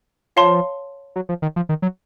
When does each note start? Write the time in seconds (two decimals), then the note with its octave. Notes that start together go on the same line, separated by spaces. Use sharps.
0.36 F3 C#5 F5 A5 C6
1.16 F#3
1.29 F3
1.42 D#3
1.56 F3
1.69 D#3
1.82 F#3